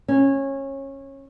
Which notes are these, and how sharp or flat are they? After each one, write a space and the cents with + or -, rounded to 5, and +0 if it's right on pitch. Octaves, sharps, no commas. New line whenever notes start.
C#4 -20